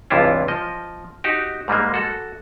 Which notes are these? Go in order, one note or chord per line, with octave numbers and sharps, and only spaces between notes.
C#2 G2 C3 E3 E4 F4
F3 D#5
D#4 F#4 G4
G#2 G3 G#3 A#3
F#4 A4